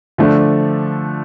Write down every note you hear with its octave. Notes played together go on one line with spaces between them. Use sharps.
D3 F3 A3 D4